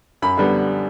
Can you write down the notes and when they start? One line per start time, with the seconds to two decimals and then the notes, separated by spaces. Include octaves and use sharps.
0.22 F#2 B5
0.37 D3 G3 B3